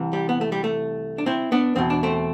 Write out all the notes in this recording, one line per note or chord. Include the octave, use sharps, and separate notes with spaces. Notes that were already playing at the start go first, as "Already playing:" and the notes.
Already playing: C2 C3 E3
G3
B3
A3
G3
A3
D4
C4 E4
B3 D4
E2 B2 C4
D4
A3 C4